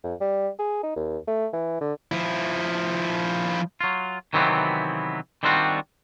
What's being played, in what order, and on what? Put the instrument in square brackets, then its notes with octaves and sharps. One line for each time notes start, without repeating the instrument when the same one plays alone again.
[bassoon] F2
G3
G#4
D#4
D#2
A3
E3
D3
[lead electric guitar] F3 E4
[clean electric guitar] F#3 F4
C3 D#3 E3 F#3 B3 C4
D#3 G3 C4 D4 F4 F#4